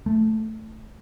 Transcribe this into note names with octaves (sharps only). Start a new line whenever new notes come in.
A3